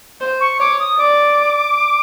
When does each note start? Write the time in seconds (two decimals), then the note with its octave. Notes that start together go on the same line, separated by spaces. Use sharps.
0.21 C5
0.40 C#6
0.60 C#5 D6
0.79 D#6
0.98 D5 D6